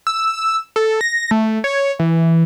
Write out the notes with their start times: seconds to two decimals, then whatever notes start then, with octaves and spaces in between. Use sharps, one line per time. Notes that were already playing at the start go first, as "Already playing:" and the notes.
0.07 E6
0.76 A4
1.01 A#6
1.31 A3
1.64 C#5
1.99 E3